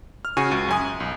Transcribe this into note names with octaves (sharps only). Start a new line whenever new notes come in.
F6
C#3 F#4 G#5 C#6 D#7
C#2
F#2 G#5 D#6
B1